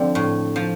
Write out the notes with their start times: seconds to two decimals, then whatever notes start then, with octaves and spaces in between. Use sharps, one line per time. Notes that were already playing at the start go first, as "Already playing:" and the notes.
Already playing: D3 F3 C4
0.15 A2
0.56 F3